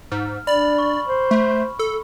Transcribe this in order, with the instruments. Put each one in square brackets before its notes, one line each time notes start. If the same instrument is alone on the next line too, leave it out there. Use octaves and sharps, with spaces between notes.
[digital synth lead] G#2 [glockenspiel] F6
[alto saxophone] D4 [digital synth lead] D5 [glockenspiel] B5 F#7
[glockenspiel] C#6
[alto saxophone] C5
[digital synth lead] A3
A4